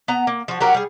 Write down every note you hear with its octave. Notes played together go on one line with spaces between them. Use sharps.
B3 A#5
A#3
F3 F#4
F#3 G4 A#4 F#5
G3 G#4